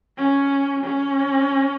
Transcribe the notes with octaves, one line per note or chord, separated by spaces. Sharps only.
C#4
C#4